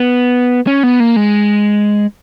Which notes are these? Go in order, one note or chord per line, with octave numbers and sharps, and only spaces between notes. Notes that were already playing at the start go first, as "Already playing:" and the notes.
Already playing: B3
C#4
B3
A#3
G#3